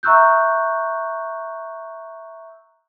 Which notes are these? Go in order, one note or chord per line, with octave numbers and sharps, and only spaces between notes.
E5 A#5 C#6 E6 F#6 G6